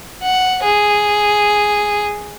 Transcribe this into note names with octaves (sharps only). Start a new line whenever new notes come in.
F#5
G#4